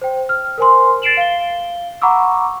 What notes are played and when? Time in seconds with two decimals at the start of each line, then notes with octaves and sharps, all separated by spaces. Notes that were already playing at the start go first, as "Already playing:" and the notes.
0.01 C5 G5
0.29 F6
0.58 A#4 C5 G#5 C6
1.02 A6 C7 D7 E7 F#7
1.17 F5 G7
2.02 F#5 A#5 B5 C#6 D6 E6